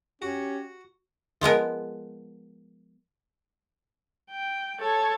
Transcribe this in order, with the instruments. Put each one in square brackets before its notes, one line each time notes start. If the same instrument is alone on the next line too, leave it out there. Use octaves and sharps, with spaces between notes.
[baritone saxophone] C#4 [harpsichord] F#4 [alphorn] G4
[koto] F3 G#3 B3 A#4
[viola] G5
A4 C#5